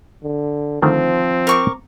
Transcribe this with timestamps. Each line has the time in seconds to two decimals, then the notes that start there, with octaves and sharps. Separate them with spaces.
0.23 D3
0.82 D3 D#3 F3 A3 C4
1.47 A#4 C#6 D6